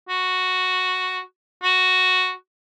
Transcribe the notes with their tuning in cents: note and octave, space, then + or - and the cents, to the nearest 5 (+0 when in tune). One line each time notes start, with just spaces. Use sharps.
F#4 -5
F#4 +0